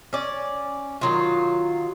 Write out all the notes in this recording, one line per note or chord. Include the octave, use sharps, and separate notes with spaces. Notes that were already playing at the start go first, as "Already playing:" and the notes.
C#4 D5
D#3 F#3 F4